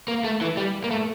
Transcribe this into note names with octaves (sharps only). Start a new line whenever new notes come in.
A#3
A3
E3
G3
A#3
A3